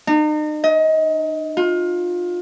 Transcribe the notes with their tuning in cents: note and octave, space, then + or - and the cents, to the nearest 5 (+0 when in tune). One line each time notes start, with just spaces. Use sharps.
D#4 -40
D#5 +25
F4 +25